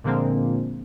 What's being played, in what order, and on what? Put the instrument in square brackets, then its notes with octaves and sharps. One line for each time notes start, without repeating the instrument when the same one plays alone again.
[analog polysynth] A#2 D3 F3 G#3 A#3 C4